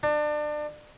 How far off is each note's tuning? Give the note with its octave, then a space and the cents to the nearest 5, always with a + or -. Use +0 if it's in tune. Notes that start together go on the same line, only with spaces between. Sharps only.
D4 +30